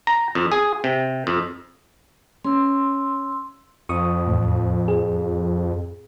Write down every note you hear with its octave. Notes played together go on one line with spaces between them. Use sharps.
A#5
F2
G#4
C3
F2
C#4 C6 E6
F2 C#6 D#6
E2 A2
G#4